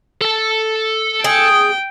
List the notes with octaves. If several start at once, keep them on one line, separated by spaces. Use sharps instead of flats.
A4 A5
G#4 G5